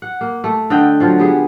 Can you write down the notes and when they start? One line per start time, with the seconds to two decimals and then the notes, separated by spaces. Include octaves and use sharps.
0.02 F#5
0.21 A#3
0.44 A3
0.70 D3 D#5 G5
1.00 F3 F#3 F4
1.18 G3 B3 G#4